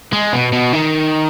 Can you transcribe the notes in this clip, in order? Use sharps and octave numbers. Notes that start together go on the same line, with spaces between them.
G#3
B2
B2
D#3